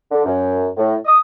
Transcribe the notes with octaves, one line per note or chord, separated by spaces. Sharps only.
D3
F#2
A2
D#6